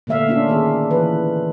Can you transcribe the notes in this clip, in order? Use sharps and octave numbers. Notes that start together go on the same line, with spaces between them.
A#2 D3 A3 E5 F5
A#3 C#4 D4 F4
D#3 A#3 G#4
E3 B4